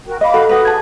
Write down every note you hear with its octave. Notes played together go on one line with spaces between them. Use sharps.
F#4 A#4 G5
D#5 F5 B5 D6
F#4 A4
F#4 B4 D#6
G#4 A5 G#6